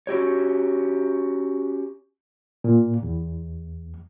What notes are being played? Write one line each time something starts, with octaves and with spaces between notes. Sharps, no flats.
C#4 F#4 G4 C#5
A#2
E2